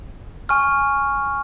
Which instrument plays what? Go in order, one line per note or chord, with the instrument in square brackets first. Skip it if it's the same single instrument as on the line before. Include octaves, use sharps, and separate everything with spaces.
[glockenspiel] G#5 C#6 F6